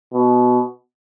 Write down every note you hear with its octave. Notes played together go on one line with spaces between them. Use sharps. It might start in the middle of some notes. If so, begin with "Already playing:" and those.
B2